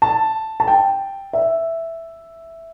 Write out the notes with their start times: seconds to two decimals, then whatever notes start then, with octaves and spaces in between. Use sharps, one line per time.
0.02 A5
0.60 A5
0.68 G5
1.33 E5